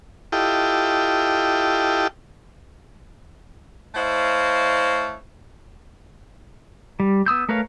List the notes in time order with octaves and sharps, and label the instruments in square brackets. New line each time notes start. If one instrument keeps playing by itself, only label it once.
[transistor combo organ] E4 F4 G4 A4 D#5 G5
[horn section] A3 E4 C5 C#5 D#5 F5
[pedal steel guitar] G3
B3 D#6 E6 G6
A3 A#4 B4 C#5 F5